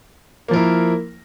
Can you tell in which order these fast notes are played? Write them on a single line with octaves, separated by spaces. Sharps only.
A#3 F3 A#4 E4